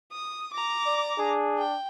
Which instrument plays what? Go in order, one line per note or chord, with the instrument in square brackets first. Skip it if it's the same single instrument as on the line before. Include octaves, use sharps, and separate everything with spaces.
[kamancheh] D#6
A#5 D6
[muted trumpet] D5
[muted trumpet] D4 [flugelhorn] G#4
[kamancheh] G5